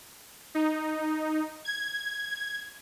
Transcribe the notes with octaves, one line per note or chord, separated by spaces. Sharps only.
D#4
G#6